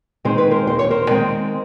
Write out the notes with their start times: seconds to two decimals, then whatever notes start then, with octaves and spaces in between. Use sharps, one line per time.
0.25 D#3 G#3 C4 C5
0.38 B4
0.51 A#4 C5
0.67 D#2 C5
0.79 C#5
0.90 A#4 C5
1.10 D#3 G#3 C4